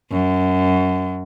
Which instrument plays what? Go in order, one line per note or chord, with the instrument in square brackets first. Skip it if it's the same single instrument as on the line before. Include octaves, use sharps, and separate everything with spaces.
[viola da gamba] F#2